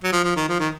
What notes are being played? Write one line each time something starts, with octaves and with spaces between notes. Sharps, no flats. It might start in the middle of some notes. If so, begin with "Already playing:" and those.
F#3
F3
F3
D#3
F3
D#3